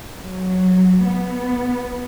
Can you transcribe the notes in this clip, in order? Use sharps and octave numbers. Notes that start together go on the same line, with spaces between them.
F#3
B3